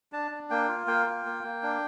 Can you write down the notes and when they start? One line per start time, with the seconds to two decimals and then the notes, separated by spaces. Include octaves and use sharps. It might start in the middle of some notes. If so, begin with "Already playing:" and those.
0.12 D4 A5
0.31 D4
0.50 A#3 G5
0.68 F4
0.87 A#3 G5
1.06 F4
1.25 A#3
1.43 A#3
1.63 D4